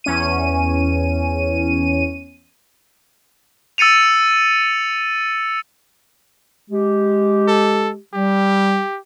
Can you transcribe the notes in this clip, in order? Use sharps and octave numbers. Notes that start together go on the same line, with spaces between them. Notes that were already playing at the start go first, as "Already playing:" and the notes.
E2 C#4 D#7
E6 A6 C#7 D#7 F7
G#3 G4
A4
G3 G4